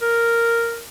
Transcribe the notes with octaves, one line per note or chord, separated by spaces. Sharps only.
A#4